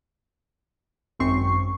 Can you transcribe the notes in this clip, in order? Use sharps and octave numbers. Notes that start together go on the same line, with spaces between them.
G#1 F#2 C4 C#6 C7